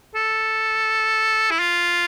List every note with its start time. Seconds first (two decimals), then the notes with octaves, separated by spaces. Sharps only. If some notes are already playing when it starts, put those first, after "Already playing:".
0.15 A4
1.51 E4
1.60 F4